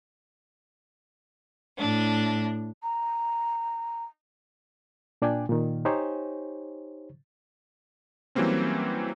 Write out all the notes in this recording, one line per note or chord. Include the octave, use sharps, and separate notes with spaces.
A2 D4
A#5
A#2 D4 D5 G5 G#5
A#2 D#3
D#4 G4 C5 C#5 G#5
E3 F#3 G3 A#3 C4 C#4